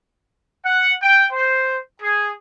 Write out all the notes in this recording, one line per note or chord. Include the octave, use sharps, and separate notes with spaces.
F#5
G5
C5
G#4